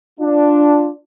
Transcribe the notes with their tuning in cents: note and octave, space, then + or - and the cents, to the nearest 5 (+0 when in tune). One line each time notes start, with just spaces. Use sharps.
D4 +0 F4 +0